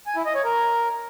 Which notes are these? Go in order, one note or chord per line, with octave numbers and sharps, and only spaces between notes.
G#5
E4
D#5
C#5
A#4